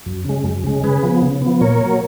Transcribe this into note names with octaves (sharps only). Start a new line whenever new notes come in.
F#2
C#3 G#3
F#2
C#3 G#3
C#3 G#4 B4
F3 B3
C#3
F3 B3
A#2 A#4 C#5
F#3 A#3